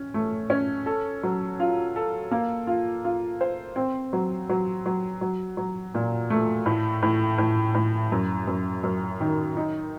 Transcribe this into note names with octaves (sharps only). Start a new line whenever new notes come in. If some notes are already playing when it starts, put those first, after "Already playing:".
Already playing: C#4
A3
C#4
A4
F#3
F4
A4
A#3
F4
F4
C5
C4
F#3
F#3
F#3
F#3
F#3
A#2
A3
A2
A2
A2
A2
F#2
F#2
F#2
D#3
D#4